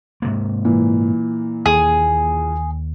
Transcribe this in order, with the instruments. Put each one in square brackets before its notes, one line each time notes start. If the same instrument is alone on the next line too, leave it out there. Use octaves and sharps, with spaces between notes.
[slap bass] G#2 C3 A#3
[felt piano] A#2 E3
[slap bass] D#2 [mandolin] G#4